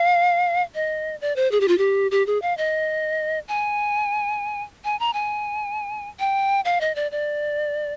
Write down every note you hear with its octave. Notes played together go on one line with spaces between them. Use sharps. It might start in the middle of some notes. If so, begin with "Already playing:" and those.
Already playing: F5
D#5
D5
C5
G#4
G4
F4
G4
G4
G#4
F5
D#5
G#5
G#5
A#5
G#5
G5
F5
D#5
D5
D5